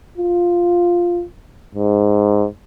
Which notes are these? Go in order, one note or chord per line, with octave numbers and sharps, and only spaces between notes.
F4
G#2